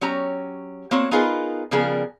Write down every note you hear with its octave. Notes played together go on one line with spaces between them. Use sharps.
F#3 C#4 G4 A#5
A#3 C4 F#4 C#5
B3 D#4 F4 G#4 A#4 B4
C#3 F3 G3 B3 G#4 A#4